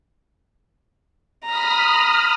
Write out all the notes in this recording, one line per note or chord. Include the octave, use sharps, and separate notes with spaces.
A#5 B5 D#6 F6